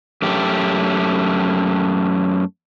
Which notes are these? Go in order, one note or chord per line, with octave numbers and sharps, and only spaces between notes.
F#2 A3 G4